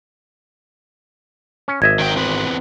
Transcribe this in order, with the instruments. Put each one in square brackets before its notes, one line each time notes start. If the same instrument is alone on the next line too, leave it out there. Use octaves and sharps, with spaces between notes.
[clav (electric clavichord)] C#4
[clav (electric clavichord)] G#1 D#5 E5 [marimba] G#6
[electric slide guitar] D#3 F#3 G5
E2 C4 B4